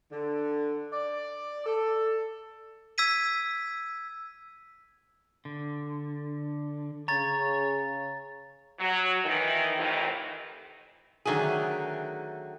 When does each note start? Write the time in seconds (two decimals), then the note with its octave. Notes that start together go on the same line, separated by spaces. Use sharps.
0.12 D3
0.92 D5
1.66 A4
2.98 E6 G#6 B6 D#7
5.45 D3
7.08 C#3 C#5 A#5 A6
8.79 F#3
9.25 D#3 E3
9.78 F2 A2 C3 D#3 E3
11.25 D3 D#3 F#3 A3 G#4